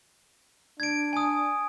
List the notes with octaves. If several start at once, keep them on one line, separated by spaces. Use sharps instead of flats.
D4 G#6 D7
G#5 D#6